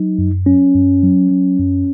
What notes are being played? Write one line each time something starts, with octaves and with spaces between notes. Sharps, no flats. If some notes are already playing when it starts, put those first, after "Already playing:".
Already playing: F#3 D#4
F#2
F#3 C#4
F#2
F#3
F#3
F#2